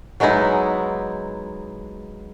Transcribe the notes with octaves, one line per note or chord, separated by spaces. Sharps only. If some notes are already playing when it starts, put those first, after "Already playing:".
F#3 G#3 B3 D#4 E4